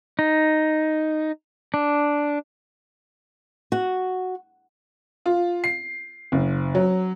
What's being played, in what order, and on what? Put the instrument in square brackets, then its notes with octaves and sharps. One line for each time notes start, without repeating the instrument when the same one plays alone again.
[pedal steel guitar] D#4
D4
[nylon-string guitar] F#4
[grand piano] F4
C7
F#1
F#3